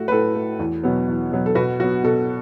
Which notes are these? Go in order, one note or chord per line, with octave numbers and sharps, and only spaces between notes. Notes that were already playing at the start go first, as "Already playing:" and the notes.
Already playing: A2 A3 F#4
B4
A2 A4
A3
E2
B2 F#3 B3
E2
B2 F#3 B3
A4
B2 F#4 B4
F#3 B3 F#4
B2 A4